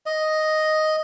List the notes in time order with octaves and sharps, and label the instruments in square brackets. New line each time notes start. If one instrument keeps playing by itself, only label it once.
[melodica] D#5